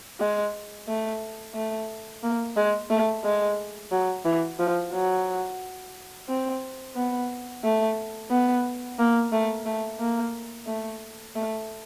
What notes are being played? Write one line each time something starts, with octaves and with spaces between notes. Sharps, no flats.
G#3
A3
A3
A#3
G#3
A3
G#3
F#3
E3
F3
F#3
C4
B3
A3
B3
A#3
A3
A3
A#3
A3
A3